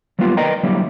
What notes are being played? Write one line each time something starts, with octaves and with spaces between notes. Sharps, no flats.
F#3 G3 A#3 B3 F4
A#4 B4 D5 D#5 G5 A#5
D3 F#3 G3 A#3 E4